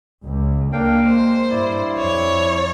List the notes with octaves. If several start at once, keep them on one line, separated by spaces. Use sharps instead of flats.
C#2
A#3 D4 F5 G5
G#3 C5
G2 E4 D5
F2 C#5